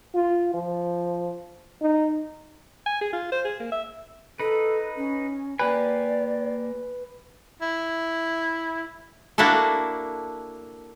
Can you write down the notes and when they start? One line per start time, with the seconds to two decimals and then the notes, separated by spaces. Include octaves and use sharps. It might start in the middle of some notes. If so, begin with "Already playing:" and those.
0.15 F4
0.54 F3
1.81 D#4
2.86 G#5
3.01 G#4
3.13 F4
3.32 C5
3.45 G#4
3.60 A#3
3.72 E5
4.40 D#4 A4 B4
4.97 C#4
5.59 A#3 G4 B4 D5 G#5
7.62 E4
9.38 A#3 D4 E4 F#4 A4